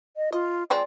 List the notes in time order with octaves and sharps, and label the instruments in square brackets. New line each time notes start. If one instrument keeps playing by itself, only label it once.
[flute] D#5
[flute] F4 [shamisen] D#5
[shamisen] F3 G#3 C4 [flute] D5